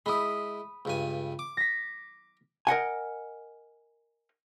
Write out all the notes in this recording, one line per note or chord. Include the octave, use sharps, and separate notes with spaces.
G#3 E4 B5 D#6
C#2 G2 G#5
D6
A#6 B6
A#4 D#5 F#5 G#5